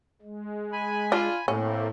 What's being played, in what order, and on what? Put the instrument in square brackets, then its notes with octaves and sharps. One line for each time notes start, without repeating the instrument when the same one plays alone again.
[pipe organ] G#3
[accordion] G#5 B5
[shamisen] D4 [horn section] F4
[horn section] A2 [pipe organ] A3 A#3 C4 [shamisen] C#4